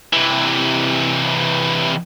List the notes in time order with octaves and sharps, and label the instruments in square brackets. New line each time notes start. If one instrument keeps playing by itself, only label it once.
[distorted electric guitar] C3 E3